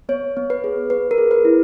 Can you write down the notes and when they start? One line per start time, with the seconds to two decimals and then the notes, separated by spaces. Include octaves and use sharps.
0.09 B3 C#5
0.37 B3
0.50 B4
0.64 G#4
0.90 B3 B4
1.11 A#4
1.18 G#4
1.31 B4
1.45 E4